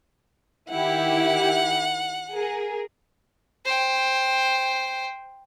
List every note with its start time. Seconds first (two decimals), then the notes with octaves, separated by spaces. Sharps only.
0.70 D#3 E4 G4 F#5
2.33 G#4 A#4
3.65 C5 G5